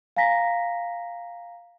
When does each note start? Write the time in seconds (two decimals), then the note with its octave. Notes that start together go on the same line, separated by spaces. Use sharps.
0.17 F5 G#5 A#5 A#6 B6